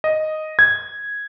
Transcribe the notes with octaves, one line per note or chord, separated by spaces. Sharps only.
D#5
G#6